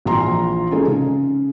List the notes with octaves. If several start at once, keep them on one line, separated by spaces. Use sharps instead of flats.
A#1 E3 F4 A#5 C6
G#3 C#4 D#4 G#4 A4
C#3